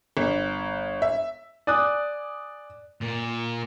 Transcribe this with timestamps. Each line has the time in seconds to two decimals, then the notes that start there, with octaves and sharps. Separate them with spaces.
0.17 G1
1.02 E5
1.67 D5 G#5 D#6 F#6
3.02 A#2